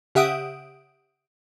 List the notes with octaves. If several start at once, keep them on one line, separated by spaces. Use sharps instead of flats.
C#3 G4 E5 F#5 D#6 D7